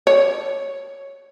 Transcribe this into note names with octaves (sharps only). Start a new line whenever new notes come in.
C#5